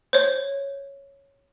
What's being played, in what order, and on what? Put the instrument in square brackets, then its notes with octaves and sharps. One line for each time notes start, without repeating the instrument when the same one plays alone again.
[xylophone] C5 C#5